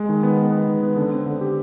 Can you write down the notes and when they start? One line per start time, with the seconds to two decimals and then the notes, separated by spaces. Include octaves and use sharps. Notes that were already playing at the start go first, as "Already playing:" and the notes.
Already playing: G#3
0.09 D#3
0.23 B3
0.37 B3
0.52 B3
0.68 D#3
0.83 B3
0.97 D3
1.13 C4
1.26 D3
1.41 G4